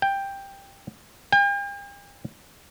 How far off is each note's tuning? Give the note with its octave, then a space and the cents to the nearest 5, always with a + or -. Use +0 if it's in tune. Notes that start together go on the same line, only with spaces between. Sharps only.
G5 +10
G5 +45